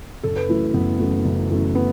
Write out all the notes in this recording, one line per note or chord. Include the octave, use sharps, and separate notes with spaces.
F#1 A4
B4
F#2 E3 A3 E4
F#1 B3
F#2 E3 A3
F#1
F#2 E3 A3
B3